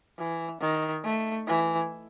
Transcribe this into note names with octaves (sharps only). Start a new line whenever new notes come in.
E3
D#3
A3
E3